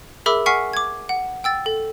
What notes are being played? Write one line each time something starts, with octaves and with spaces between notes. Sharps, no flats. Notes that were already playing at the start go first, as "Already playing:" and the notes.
G#4 A#4 E5 B5 D6 E6
F#5 G#5 C#6 F6 B6 C7
D6 G#6
F#5
G5 E6 A6
A4